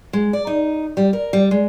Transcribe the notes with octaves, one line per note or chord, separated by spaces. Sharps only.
G#3
D5
D#4
G3
A#4
G3
G#3